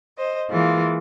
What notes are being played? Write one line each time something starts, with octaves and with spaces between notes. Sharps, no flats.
C5 D#5
E3 G#3 A#3 F4